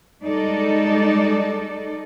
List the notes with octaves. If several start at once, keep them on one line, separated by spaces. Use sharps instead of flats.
G3 G#3 D#4 A4 D5